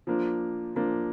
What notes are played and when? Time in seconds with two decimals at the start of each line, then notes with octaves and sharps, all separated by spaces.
0.07 F3 A#3 D4
0.76 F3 A#3 D4